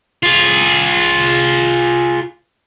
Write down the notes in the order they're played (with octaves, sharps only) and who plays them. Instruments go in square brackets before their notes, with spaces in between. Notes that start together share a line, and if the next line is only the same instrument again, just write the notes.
[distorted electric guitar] F4 G#4